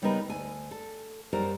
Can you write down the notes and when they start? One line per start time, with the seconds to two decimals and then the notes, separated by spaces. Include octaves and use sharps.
0.02 C#3 G3 B3 D#4 A#4 B4
0.28 D2 G#5
0.71 A4
1.33 F#2 G3 A#4 C5